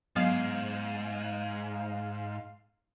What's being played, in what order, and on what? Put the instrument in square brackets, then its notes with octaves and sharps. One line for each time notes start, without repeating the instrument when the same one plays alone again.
[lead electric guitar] G#2 [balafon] F#3 B3 [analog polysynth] F5